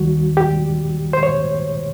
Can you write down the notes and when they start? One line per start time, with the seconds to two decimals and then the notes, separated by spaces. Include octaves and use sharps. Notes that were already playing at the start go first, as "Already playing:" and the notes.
Already playing: D#2 D#3 G3 F#4
0.37 G4
1.13 C5
1.23 C#5